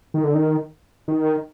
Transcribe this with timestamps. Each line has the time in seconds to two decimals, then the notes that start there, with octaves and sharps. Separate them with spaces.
0.14 D#3
0.24 D3
0.35 D#3
1.08 D#3